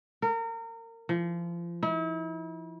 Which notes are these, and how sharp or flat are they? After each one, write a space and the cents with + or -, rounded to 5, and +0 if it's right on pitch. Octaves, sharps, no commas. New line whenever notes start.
A#4 -30
F3 -30
E4 -40